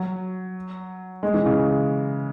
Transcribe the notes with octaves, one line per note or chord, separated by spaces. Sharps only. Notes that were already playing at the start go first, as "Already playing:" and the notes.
Already playing: F#3
G#3
E3
C#3